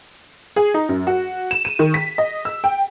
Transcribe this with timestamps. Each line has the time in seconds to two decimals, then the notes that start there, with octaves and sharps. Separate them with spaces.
0.56 G#4
0.74 D#4
0.89 F#2
1.07 F#4
1.51 E7
1.65 D#7
1.79 D#3
1.94 B6
2.18 D#5
2.45 E6
2.64 G5